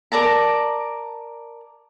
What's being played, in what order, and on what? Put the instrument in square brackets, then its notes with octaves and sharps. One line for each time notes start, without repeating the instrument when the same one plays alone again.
[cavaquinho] A#4 D5 A5 A#5